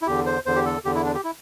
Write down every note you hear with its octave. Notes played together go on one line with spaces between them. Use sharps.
E4
E2 D3 G4
C5
E2 D3 C5
G4
A4
E2 D3 G4
E4
D4
G4
E4